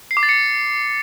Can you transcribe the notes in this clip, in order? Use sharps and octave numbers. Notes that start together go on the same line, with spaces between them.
C7
D6
A6
C#7